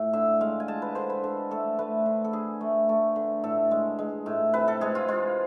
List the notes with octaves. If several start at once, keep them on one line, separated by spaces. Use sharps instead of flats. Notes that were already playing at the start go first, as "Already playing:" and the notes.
Already playing: A2
D3 E5
G#3 F5
G#5
G#3 A5
B4
D3 C5
B4
D3 A4
A3 A4
A3 B4
D3
A4
D3 G#4
A3
A3
D3
A2 A4
G#3
G#3
A2
C3 B4
A4
G#3 G#4
F4
G#3 F4